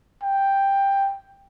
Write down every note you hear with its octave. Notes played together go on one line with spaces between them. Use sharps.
G5